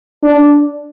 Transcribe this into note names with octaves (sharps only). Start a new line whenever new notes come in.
D4